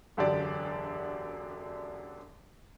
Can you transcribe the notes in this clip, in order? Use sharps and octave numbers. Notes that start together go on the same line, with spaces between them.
E1 F#2 D3 D4 G4 D5